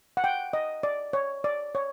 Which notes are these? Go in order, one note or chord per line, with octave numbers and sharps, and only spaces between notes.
F#5
G5
D#5
D5
C#5
D5
C#5